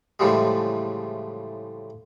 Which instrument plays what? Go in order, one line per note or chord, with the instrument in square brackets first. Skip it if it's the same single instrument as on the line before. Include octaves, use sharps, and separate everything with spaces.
[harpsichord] A2 C#3 E3 F3 G3 G#3